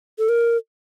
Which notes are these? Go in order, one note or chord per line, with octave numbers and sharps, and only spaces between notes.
A4
A#4